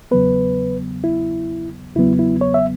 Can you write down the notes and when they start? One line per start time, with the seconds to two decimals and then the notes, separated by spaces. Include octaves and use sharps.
0.11 E2 C#3 F#3 B3 B4
1.04 E4
1.96 E2 C#3 F#3 B3 E4
2.19 E4
2.41 C#5
2.54 E5